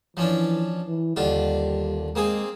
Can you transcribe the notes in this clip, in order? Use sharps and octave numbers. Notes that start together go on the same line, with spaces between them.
E3 F3 C#4 D4
E3
D#2 D3 G3 F4
G#3 A#3 C4 G#4